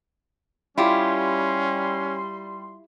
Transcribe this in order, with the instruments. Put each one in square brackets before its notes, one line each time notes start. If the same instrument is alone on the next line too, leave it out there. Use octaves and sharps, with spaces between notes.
[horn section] G3 C6 [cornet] C#4 [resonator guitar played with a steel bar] E4 F4 G4